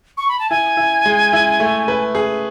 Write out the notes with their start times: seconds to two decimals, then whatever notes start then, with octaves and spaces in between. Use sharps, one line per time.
0.17 C#6
0.28 B5
0.39 A5
0.50 E4 G#5
0.77 E4
1.06 G#3
1.33 E4
1.60 A3
1.88 B4
2.15 G#4